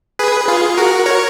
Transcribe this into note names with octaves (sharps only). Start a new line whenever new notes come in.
G#4 B4
F4 G#4
F#4 A#4
A#4 C#5